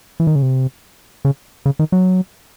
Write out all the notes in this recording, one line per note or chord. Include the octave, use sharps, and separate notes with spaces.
E3
D#3
C#3
C3
C#3
C#3
D#3
F#3